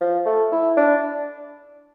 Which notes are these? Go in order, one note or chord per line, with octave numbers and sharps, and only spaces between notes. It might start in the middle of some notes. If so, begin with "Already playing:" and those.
F3
A3
E4
D4